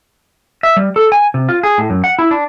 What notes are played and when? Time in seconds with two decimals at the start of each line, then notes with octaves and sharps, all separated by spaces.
0.63 E5
0.77 G3
0.96 A4
1.12 G#5
1.34 C3
1.49 F4
1.63 G#4
1.78 A2
1.90 F#2
2.04 F#5
2.19 E4
2.31 D4